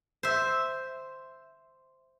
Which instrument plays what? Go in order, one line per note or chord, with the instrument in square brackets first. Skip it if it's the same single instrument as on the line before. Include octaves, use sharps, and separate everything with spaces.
[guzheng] C5 E5